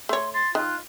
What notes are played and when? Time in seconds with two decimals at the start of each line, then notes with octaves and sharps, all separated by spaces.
0.09 A3 C#5 C6
0.34 C6 A6
0.55 D#3 F4 F#6